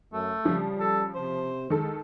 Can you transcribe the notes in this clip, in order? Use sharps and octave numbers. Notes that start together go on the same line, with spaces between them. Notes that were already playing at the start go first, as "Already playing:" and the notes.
F#2 A3
C#3 F3 G3
A4
C3 C5
D#3 G#3 A4